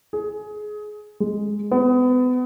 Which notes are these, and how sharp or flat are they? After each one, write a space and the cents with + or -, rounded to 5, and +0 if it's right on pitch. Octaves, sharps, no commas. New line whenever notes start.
G#4 +20
G#3 +0
B3 +30